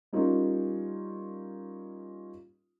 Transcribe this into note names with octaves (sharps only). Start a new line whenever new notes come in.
G3 A#3 C#4 D#4 F4